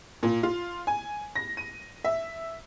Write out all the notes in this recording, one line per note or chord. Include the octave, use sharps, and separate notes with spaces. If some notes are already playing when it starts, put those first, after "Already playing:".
A#2
F4
G#5
A#6
D#7
E5